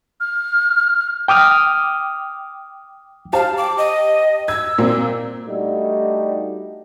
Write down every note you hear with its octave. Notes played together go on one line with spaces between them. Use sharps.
F6
G5 D6 D#6 F6
G4 C5 F5 A5
D6
D#5
E6 G#6
A#2 A#3 C4
G3 A3 D4 D#4 F#4